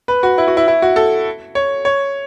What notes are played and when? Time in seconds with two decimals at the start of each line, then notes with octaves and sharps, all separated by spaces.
0.08 B4
0.23 F#4
0.38 E4
0.48 F#4
0.57 E4
0.68 E4
0.82 F#4
0.96 A4
1.55 C#5
1.85 C#5